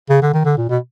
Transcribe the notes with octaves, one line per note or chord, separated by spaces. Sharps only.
C#3
D3
D#3
D3
A#2
B2